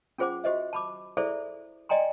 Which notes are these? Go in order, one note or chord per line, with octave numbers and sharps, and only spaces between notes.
C#4 F4 G#4 C5 F#5 D6
F#4 G4 C5 D#5 E5
A5 B5 D6
E4 G#4 A4 C5 D5 E5
D5 D#5 G5 G#5 A#5 C6